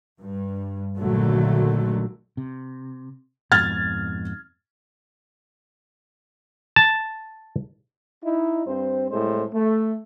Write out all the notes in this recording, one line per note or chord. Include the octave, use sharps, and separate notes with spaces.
G2
A#1 D3 D#3 F#3 A3
C3
F2 G#2 B2 F6 G#6 A6
A5
D#4 E4
G2 C4 C5
C2 A2 G#3 C5
A3